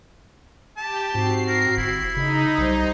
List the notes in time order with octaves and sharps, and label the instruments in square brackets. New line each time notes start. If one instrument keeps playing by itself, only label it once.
[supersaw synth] G4 [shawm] A5
[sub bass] G#2 [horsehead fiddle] C4 F#4 [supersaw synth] C7
[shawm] A#4
[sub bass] G1 [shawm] E4
[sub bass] C#3 [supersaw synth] D#4 [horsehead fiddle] B5
[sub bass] B1 [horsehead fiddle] G3 C5